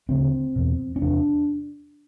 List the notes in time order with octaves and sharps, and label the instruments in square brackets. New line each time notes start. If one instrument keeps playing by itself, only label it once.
[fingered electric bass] D2 C#3 C4
E2 B2
C#4
E2 C3 D4